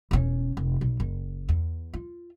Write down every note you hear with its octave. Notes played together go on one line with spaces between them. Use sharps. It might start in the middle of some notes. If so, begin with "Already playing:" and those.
E1 C#4
F1
B1
F#1
E2
F4